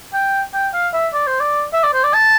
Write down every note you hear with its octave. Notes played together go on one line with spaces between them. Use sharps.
G5
G5
F5
E5
D5
C5
D5
E5
D5
C5
D5
A5